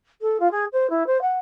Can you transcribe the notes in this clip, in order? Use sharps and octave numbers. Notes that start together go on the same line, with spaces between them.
A4
F4
G#4
C5
E4
C5
F#5